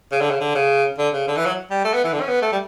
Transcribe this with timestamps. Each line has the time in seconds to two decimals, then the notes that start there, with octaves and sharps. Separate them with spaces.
0.12 C#3
0.21 D3
0.30 C#3
0.41 D3
0.55 C#3
0.98 D3
1.13 C#3
1.27 D3
1.37 E3
1.46 F#3
1.71 G3
1.84 A3
1.94 B3
2.04 E3
2.13 D3
2.21 C#4
2.28 B3
2.42 A3
2.52 G3